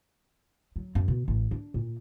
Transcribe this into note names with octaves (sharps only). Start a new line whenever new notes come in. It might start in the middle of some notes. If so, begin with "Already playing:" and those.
F#3
F#2
B2
A1
D4
A#2